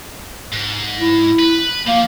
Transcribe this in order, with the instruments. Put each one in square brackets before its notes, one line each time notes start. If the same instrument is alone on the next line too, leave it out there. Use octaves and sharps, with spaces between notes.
[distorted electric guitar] G#2
[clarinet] E4
[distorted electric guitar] B4
[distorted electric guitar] F3 [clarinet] A#3